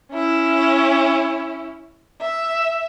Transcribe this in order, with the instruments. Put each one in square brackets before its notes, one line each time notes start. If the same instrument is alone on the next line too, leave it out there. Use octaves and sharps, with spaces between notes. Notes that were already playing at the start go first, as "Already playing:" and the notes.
[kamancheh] C#4 E4
E5